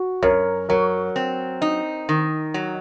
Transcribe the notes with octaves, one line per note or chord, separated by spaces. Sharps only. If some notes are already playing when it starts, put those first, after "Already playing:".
Already playing: F#4
F#2 A#4 C#5
F#3 A#4 C#5
C4
D#4
D#3
F#3